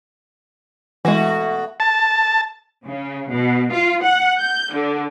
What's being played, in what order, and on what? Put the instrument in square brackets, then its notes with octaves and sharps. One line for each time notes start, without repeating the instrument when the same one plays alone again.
[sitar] B2 A3 F#4 [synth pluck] E3 G#3
[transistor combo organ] A5
[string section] C#3
B2
F4
F#5
G6
D3